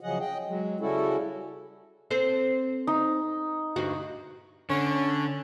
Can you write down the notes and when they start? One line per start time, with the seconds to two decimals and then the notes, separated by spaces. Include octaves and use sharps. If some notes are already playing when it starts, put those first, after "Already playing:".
0.01 C#3 F3 F#3 G#4 D#5 F#5
0.20 D#5 G5
0.47 F#3 G#3
0.80 C#3 G3 C#4 E4 F#4 A4
2.11 C4 A4 C5
2.87 D#4
3.76 D2 G2 F#4
4.70 D3 C#4